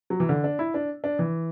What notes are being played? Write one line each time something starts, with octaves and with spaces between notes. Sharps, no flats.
F#3
E3
D3
D4
E4
D4
D4
E3